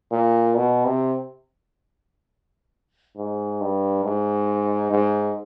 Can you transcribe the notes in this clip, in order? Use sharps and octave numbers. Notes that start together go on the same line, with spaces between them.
A#2
B2
C3
G#2
G2
G#2
G#2